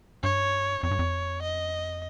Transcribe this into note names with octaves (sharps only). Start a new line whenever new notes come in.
G2 C#5
F2 C#5
G2
F2
D#5